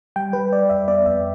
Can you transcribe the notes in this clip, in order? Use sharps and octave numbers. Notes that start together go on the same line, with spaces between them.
G3 G5
G3 B4
G3 D5
F2 E5
B3 D5
F2 E5